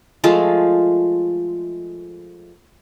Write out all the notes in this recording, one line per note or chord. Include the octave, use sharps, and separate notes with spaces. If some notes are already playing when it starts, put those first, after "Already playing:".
F3 G#3 A3 F4